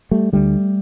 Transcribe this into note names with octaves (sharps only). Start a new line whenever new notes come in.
G3 A3
D2 D3 G3 A3